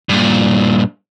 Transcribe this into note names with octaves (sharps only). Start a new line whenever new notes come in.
G2 A#2